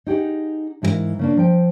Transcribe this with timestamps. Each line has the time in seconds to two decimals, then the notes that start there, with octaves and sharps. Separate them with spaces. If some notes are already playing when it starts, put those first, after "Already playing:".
0.06 D#4 G4 G#4 F#5
0.82 G#2 E3 G#4 A#4 F5
1.19 C#3 A#3 D4
1.37 F3 G5